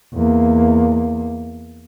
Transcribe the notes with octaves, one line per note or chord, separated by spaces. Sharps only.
E2 A#3